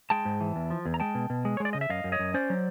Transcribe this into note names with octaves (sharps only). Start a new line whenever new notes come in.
G#3 G5 A5
G#2
E3
E2
F3
E2
A#5
G#3 G5 A5
B2
B2
G#3
C#5
G#3
D5
C#3 D#5
E5
F#2 D#5 F5
F#2
C#5 D#5
F#2
C#4 C5 D5
F#3